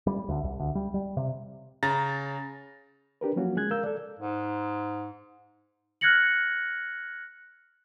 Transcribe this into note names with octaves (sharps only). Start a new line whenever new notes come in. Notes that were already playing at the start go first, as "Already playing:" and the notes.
G3
D2
C2
D2
G3
G3
C3
C#3 A#5 A6 A#6
D4 G4 A#4 B4
F3 F#3 A#3 C#4 F4 F#4
G#3 G#4 F#6 G#6
A#4 F5 E6 G6
A4 D5
G#2
F6 F#6 G#6 A#6 C#7 F#7